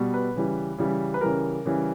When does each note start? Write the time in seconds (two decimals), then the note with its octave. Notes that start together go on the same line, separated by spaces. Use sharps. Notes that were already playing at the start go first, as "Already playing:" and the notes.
Already playing: B2 G3
0.14 B4
0.36 C#3 E3 G3
0.78 C#3 E3 G3
1.14 B4
1.21 C#3 E3 G3 A#4
1.65 C#3 E3 G3